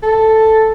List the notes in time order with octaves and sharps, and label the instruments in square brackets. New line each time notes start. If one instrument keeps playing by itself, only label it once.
[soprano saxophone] A4